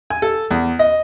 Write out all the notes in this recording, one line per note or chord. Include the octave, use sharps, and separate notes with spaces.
G#5
A4
E2
D#5